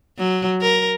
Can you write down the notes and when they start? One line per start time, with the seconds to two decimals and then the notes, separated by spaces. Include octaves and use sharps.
0.18 F#3
0.61 A#4